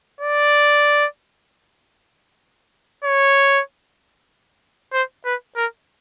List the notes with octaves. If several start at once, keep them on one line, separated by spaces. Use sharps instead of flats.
D5
C#5
C5
B4
A#4